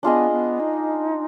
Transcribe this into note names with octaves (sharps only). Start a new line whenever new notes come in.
B3 D4 F4 G#4 D#5
B3
D#4